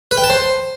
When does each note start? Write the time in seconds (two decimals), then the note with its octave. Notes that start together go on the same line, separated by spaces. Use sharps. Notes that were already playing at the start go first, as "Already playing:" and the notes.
0.11 B4
0.18 G5
0.24 A5
0.30 C5